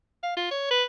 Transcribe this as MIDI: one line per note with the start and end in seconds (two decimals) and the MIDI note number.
0.23 0.32 77
0.37 0.50 65
0.51 0.68 73
0.71 0.84 71